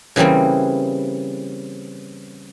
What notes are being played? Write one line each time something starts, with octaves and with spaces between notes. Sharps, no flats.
C#3 E3 G3 A#3 C4